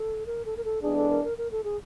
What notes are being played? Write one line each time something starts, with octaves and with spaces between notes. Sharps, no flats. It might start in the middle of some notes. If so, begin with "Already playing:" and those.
Already playing: A4
A#4
A4
A#4
A4
E3 G#3 B3 D4 G#4
A4
A#4
A#4
A#4
A4
G#4